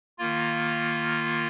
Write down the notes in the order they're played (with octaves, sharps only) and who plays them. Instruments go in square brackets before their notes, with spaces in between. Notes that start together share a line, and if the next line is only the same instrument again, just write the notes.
[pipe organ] D#3 A#3 F4